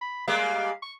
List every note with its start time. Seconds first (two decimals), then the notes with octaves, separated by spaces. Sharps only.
0.01 B5
0.28 G3 G#3 A#3 F5
0.82 C#6